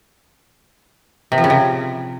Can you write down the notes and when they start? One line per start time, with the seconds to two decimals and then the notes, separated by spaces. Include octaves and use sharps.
1.32 C3
1.38 F3
1.44 C#3
1.50 C3